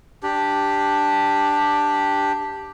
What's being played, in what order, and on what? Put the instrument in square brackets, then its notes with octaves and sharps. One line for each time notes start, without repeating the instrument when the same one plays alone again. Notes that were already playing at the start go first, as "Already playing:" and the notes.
[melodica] D4 G4